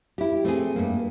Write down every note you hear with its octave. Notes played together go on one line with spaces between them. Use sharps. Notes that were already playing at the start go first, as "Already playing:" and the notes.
E4 G4
A3 C4 G#4
G2 A#3